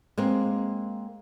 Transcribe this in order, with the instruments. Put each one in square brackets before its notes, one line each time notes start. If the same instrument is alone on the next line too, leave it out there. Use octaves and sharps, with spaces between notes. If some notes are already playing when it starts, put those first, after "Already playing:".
[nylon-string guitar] G#3 A#3 C4